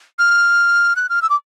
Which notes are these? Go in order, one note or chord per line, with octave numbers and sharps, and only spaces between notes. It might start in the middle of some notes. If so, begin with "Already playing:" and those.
F6
F#6
F6
E6
D6